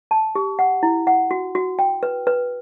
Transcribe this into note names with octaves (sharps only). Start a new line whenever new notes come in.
A5
G4
F#5
E4
F#5
F#4
F#4
G5
B4
B4